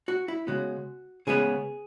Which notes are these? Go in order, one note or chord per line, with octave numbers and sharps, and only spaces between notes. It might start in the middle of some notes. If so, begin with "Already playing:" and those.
F#4
E4
C#3 G#3 B3 F#4
C#3 G#3 B3 G#4